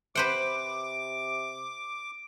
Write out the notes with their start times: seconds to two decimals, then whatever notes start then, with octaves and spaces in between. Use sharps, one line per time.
0.15 C3 B4 C5 F#5 D6 D7